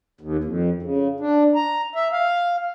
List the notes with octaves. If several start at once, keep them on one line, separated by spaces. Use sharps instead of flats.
D#2
F2
C#3
D4
A#5
E5
F5